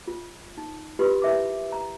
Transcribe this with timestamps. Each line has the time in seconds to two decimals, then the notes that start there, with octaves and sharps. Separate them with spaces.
0.07 F4
0.58 D#4
0.99 F4 G4 B4 B5 C6
1.22 E4 A#4 E5 G#5 D6
1.72 A#5